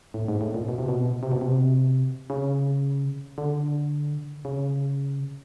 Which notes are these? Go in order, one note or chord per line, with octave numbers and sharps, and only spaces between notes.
A2
G#2
A2
A#2
B2
C3
B2
C3
B2
C3
C#3
D3
C#3